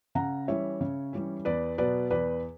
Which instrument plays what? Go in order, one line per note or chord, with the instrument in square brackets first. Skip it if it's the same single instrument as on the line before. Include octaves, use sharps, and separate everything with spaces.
[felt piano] C#3 F#5 A#5
E3 G3 C#4 C#5 E5
C#3
E3 G3 C#4
E2 B4 D5
B2 F#3 B3 B4 D5
E2 B4 D5